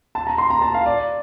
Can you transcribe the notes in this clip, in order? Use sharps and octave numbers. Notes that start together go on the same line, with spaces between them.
A5
A#5
C6
A#5
A5
F5
D5